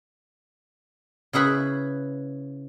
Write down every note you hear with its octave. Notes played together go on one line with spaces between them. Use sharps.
C#3 E4 G#4 B4 B5